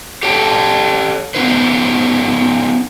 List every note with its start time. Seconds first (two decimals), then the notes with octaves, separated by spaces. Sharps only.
0.23 G4 A4 C#5 G5 A5
1.35 B3 C#4 D#4 F4 B4 C5